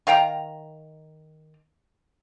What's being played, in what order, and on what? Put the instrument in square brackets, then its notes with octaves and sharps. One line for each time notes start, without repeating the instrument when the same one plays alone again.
[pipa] D#3 F5 G5 A#5